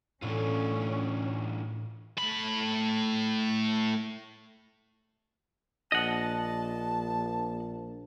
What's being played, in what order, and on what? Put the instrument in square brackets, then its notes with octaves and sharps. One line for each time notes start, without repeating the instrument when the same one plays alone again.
[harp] A2 [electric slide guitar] E3 D4 F4 [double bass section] C#4
[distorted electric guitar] A2 B5
[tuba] A#1 [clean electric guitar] D#5 F#5 [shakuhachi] A5